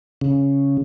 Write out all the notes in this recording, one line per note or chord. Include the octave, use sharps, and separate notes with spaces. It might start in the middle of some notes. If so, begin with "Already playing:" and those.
C#3